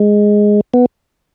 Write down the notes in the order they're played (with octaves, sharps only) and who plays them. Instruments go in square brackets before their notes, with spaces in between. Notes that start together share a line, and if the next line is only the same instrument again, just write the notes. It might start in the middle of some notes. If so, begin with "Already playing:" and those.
Already playing: [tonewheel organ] G#3
B3